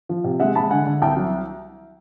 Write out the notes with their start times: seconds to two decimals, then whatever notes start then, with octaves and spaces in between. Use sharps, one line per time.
0.09 F3
0.24 C3
0.40 G#3 E5 F#5
0.55 G#3 A5 B5
0.71 D3 F#5 G#5
0.86 D3
1.02 C2 G5 A5
1.17 F#3